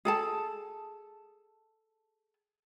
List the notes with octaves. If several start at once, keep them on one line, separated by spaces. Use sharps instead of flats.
G#4 A4 A5